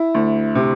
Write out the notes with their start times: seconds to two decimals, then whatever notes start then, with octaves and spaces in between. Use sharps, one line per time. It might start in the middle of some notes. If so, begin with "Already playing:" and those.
Already playing: E4
0.15 D2
0.55 C3